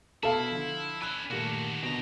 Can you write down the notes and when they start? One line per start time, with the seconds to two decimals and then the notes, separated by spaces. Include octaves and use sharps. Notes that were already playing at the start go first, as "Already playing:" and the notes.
0.23 B2 E4 A4 F5
0.51 D3 F3
1.02 D4 G#5 B5 E6 F#6
1.31 A#2 D#3 G3 A3 F#4
1.83 B2 D3 C4 A#5